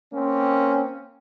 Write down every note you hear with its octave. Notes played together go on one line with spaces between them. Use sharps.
A#3 C4 C#4